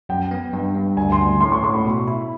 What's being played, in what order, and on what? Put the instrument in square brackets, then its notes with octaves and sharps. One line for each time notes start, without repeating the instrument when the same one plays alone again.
[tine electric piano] F#2 [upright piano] G5
[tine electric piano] B3
G2
G2
[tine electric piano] D2 [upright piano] G#5
[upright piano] C6
[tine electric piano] D2
[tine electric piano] A2 [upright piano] C6
[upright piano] C#6
[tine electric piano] A2 [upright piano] C#6
[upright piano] B5
[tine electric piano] B2
E4